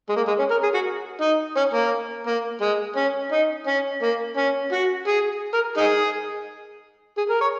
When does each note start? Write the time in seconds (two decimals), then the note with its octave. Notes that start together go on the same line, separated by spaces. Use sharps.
0.09 G#3
0.16 A#3
0.27 G#3
0.39 C#4
0.51 A#4
0.63 G#4
0.74 F#4
1.21 D#4
1.56 C#4
1.74 A#3
2.27 A#3
2.61 G#3
2.96 C#4
3.31 D#4
3.67 C#4
4.02 A#3
4.37 C#4
4.72 F#4
5.07 G#4
5.54 A#4
5.77 D#4 G#4
7.18 G#4
7.29 A#4
7.41 C#5